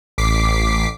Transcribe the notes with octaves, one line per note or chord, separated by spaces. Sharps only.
A1 D6 B6 C7